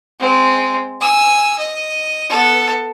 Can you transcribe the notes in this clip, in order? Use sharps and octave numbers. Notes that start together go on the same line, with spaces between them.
G#3 C4
G#5 E6
D#5
B3 A4